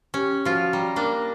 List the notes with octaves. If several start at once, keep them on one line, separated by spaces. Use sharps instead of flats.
C#4 G4
F3 F4 F#4
G3 A#5
A#3 D4